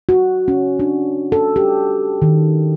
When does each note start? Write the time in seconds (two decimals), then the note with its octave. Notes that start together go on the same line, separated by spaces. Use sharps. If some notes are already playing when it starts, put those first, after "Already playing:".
0.09 F#4
0.48 C#4
0.79 D4
1.32 A4
1.56 G4
2.22 D#3